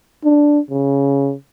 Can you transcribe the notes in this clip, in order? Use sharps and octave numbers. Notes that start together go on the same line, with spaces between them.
D4
C#3